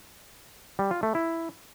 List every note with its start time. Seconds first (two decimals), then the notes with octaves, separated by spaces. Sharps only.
0.79 G3
0.91 F4
1.03 A3
1.15 E4